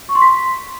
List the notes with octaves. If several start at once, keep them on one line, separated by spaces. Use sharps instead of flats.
C#6
C6
B6